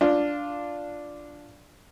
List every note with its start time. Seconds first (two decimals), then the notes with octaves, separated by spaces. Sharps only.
0.01 D4 F4